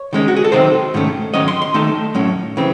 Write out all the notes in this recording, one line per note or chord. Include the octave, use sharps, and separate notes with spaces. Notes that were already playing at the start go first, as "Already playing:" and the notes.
Already playing: C#5
D#3 G#3 C#4
F#4
G#4
A4
C3 D#3 F#3 C4 D#4 C5
G#2 D#3 A3 C#4
D#3 F#3 C#4 D#5
C6
C6
D#3 A3 D#4 A5
A2 F#3 C#4
C#3 E3 C4